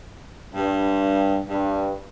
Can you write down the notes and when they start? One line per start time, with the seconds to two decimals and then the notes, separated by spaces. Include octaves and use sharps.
0.55 G2
1.49 G2